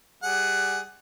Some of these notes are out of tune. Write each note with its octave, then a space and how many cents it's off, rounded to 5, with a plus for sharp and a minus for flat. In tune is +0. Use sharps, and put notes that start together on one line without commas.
G3 +5 G#4 +0 F#5 +15